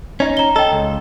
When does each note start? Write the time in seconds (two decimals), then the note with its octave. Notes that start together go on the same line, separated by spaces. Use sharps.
0.20 C#4 D#4
0.37 A#5 G7
0.56 A4 D#5 G5
0.72 C#2